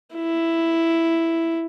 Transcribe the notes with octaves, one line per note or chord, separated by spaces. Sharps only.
E4